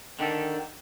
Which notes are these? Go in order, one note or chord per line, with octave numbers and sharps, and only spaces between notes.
D3 D#3 G4 A4